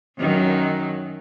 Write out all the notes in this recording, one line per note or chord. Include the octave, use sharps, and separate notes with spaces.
F#2 D#3 F#3